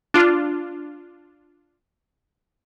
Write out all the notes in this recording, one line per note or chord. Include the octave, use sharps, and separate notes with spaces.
D4 F4